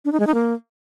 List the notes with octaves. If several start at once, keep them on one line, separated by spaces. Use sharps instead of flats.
D4
D#4
G#3
D#4
A#3